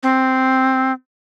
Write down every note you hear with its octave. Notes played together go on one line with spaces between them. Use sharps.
C4